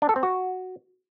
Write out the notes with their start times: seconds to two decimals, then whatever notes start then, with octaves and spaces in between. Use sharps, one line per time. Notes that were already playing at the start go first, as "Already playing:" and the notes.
0.02 D4
0.09 A4
0.16 C4
0.23 F#4